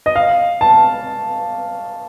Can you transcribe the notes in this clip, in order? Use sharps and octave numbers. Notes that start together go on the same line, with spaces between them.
D#5
F5
A5